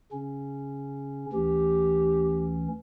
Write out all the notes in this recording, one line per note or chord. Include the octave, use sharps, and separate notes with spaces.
C#3 C#4
D2 E3 C#4 G4